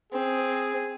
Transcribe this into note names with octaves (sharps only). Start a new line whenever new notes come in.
C4 G#4